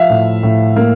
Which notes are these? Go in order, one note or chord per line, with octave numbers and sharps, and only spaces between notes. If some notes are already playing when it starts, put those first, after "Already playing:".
Already playing: F3 E5 F5
A2
A2
A#3